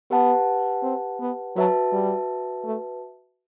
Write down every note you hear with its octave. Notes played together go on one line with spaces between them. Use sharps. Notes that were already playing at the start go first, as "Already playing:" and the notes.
B3 G4 B4 F#5 A5
C4
B3
F#3 F#4 B4 E5 A5
G3
A3